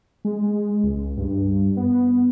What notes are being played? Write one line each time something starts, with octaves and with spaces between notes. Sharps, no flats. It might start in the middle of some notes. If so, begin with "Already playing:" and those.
G#3
C#2
G2
B3